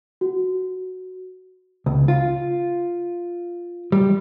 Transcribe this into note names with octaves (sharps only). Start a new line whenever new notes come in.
F#4
C#2
F4
G3